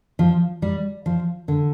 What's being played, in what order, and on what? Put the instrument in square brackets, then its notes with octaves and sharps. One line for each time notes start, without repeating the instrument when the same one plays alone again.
[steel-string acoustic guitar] F3
G3
F3
D3